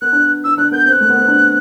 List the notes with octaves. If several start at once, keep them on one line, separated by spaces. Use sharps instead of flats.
B3 F#6
D4
D4 E6
D4 F#6
B3 G6
C4 F#6 G6
A3
B3
C4
D4